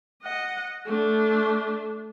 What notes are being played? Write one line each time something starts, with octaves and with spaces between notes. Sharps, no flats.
D#5 F#5
A3 D4